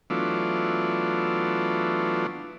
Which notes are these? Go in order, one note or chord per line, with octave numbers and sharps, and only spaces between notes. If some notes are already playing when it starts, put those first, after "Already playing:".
E3 F#3 A3 B3 D4 F4